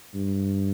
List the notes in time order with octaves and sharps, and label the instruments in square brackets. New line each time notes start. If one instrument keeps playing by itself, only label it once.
[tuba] G2